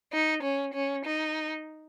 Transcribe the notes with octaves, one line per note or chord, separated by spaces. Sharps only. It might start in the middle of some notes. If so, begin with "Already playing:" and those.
D#4
C#4
C#4
D#4